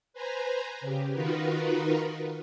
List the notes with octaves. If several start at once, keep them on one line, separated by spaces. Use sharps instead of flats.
B4 C5 G#5 A#5
C#3 G4
D#3 D#4 F4 F#4 A#4 B4